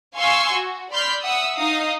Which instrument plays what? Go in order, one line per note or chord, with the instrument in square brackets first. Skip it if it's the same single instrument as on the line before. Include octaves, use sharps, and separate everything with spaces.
[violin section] F5 G#5 C6 C#6 E6
F#4
D5 B5 C6 F6 G6 B6
E5 F#5 D#6 E6
D#4 F5 D#6